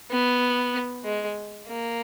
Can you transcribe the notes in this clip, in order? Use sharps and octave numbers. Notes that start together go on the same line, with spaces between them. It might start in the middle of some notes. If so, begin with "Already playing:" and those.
B3
G#3
A#3